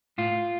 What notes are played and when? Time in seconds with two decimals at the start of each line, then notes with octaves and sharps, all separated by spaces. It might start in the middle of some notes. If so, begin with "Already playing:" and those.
0.18 A2 F4